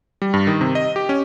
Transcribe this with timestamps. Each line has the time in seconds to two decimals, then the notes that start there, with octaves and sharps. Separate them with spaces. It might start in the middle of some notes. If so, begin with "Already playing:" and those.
0.22 G3
0.34 G2
0.47 D#3
0.61 C3
0.75 D#5
0.96 G4
1.09 C#4